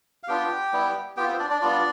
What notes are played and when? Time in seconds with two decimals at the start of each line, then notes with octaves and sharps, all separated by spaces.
0.23 F5
0.28 B3 D4 F4 G4 G5
0.73 G3 B3 E4
1.17 B3 F4 G4 G5
1.28 C4 C5
1.39 D4 D5
1.50 D4 D5
1.61 G3 B3 D4 F4 D5